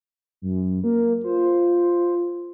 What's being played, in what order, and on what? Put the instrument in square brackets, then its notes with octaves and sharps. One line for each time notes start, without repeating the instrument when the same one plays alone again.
[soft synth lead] F#2
A#3
[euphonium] F4 [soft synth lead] C5